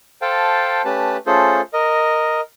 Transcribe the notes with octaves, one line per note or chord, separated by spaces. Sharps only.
A4 C5 F5 G5 A5
A3 C#4 G4 B4 A5
A3 C#4 F4 G#4 A4 C5
A#4 D#5